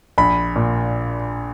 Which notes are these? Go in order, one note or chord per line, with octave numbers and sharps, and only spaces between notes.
A#1 B5
A#2